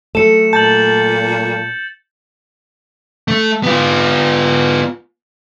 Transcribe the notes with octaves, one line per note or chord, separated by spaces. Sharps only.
F#3 A3 A4 C#7 E7
A#2 A5 G6 A6 F#7
A3
B3 F4